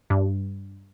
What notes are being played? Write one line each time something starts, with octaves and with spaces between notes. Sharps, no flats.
G2